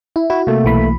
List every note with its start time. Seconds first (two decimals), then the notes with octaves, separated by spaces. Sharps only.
0.16 E4
0.30 E4 F#4
0.47 C3 A3 A#3
0.65 B1 E3 B5